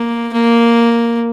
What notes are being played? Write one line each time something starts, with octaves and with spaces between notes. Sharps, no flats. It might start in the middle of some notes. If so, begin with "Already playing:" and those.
Already playing: A#3
A#3